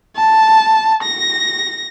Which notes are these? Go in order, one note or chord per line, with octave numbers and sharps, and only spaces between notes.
A5
A#6